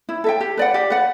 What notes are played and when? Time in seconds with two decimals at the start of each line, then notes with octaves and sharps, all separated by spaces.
0.09 E4
0.24 A4 E5 G5
0.41 G4
0.57 B4 D5 F#5
0.74 G4
0.90 B4 D5 F#5